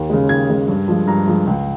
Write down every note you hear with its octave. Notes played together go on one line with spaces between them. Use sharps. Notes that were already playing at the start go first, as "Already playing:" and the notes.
Already playing: D#2
C#3 G#3
D#2 G#6
C#3 G#3
G2
F3 G#3
G2 A#5
F3 G#3
C#2